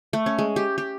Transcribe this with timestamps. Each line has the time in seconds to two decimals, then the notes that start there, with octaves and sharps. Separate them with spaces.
0.13 A3
0.26 C#4
0.39 G#3
0.56 G4
0.78 G4